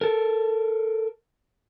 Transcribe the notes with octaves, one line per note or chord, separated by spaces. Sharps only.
A4 A#4